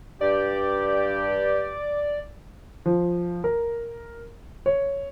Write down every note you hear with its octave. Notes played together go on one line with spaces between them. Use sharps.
G2 G4 D5
F3
A#4
C#5